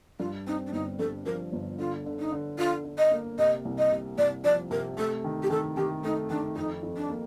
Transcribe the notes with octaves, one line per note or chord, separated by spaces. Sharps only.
G2 F4
C4 D#4
D4
G1 D#4
G2 A4
F3 A#4
G1
D3 F4
D3
D#4
D3
D3 F4
D3
D#5
A#3
C3 D#5
C2
D#5
C3
C2 D5
F3 D5
C3 A#4
A3 A4
D#3
G4
D#3 A4
D#3 G4
A3 D#4
D#3 D4
F2 D#4
F2
D4
A#3